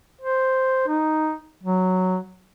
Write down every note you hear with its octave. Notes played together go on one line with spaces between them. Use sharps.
C5
D#4
F#3